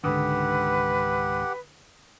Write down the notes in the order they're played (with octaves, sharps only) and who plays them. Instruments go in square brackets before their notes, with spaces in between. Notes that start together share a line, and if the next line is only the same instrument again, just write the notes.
[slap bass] C#2 G#2 D#3 [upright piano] D3 D#6 [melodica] G4 F#5 [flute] B4